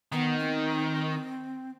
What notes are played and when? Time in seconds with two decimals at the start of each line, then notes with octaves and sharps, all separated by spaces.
0.12 D#3 B3
0.39 C4